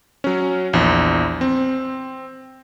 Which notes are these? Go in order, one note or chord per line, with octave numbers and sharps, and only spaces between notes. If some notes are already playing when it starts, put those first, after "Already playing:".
F#3 C#4
A#1 E2
C4